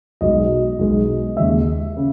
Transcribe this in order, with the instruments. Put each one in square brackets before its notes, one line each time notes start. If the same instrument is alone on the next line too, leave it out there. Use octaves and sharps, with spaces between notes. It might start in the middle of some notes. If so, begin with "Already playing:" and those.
[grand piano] B1 B2 G#3 D#5
B1 B2 G#3
D#2 C#3 G#3 E5
C#3